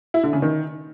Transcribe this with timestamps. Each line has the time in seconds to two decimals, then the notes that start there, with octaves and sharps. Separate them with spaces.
0.14 E4
0.23 D3
0.33 C#3
0.42 D#3